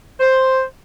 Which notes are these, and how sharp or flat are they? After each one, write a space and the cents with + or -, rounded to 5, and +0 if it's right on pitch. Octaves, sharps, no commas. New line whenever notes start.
C5 +5